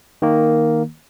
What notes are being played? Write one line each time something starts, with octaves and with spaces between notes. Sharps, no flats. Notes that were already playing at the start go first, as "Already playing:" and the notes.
D#3 A#3